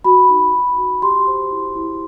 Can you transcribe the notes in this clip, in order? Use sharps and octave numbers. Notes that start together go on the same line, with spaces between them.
F#4 B5
D#4
F#4
F#4
G4 C6
C5
E4
E4